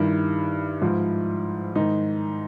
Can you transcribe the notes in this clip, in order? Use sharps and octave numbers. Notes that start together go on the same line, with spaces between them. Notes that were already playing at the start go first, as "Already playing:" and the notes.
Already playing: G2 D#3 E4
G#2 F3
G#2 D#3 D#4